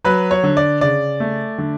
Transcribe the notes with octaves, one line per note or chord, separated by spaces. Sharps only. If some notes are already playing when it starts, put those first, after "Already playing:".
F#3 B4
C#5
D3
D5
C#3 D5
A3
D3